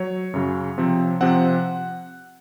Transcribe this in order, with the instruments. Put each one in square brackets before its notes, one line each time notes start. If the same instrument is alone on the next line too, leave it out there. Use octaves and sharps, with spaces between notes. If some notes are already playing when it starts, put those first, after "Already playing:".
Already playing: [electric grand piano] F#3 C#5
F#2 C#3 F#3
C3 F3 C4
C3 F3 C4 F#5